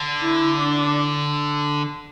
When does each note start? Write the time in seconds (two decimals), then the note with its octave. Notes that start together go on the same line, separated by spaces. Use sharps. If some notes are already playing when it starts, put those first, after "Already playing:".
Already playing: D3
0.22 E4
0.58 D4